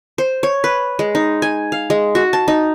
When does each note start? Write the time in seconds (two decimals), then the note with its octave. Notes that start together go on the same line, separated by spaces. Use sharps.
0.18 C5
0.43 C#5
0.64 B4
0.99 G#3
1.15 D#4
1.42 G#5
1.72 F5
1.90 G#3
2.15 F#4
2.33 A5
2.48 D#4